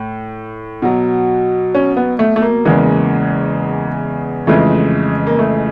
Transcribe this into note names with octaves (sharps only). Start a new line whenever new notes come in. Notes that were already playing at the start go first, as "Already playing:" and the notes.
Already playing: A2
B2 F#3
C#4
B3
A3
A3
A#3
E2 C#3 E3 G#3
F2 C#3 E3 G#3 A3
A#3
A3